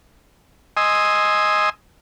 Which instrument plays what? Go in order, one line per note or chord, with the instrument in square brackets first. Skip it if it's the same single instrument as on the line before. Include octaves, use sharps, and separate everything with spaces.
[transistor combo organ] D#5 G#5 C6 D#6 E6